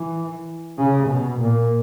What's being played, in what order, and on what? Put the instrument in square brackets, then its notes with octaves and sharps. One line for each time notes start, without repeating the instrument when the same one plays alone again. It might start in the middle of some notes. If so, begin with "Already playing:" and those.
Already playing: [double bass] E3
C#3
B2
A#2